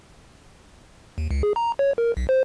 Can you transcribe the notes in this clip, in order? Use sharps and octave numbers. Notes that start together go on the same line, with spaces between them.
D#2
C#2
G#4
A#5
C#5
A#4
B1
C5